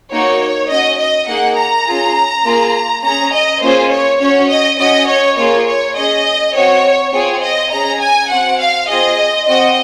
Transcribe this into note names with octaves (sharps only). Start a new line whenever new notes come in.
A#3 D#4 F#4 C#5
C#4 F#4 D#5
D#5
A#3 D#4 G#4 F#5
A#5
C#4 F4 G#4
A#3 F4 G#4
C#4 G#4 A#5
D#5
A#3 C#4 F4 G#4 C5
C#5
C#4 F#4 C#5
D#5
C#4 F#4 D#5
C#5
A#3 F4 G#4 C#5
C#5
C#4 G#4 D#5
C4 F#4 C#5
C4 F4 G#4 C#5
D#5
C#4 G#4 A#5
G#5
C4 F#4 F#5
F5
C4 F4 G#4 D#5
C4 F#4 D#5